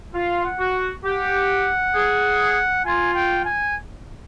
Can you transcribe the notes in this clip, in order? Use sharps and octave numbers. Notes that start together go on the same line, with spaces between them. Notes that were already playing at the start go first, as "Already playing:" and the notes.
F4 F5
F#5
F#4
G4 F#5
G#4
F4 G#5
G5
G#5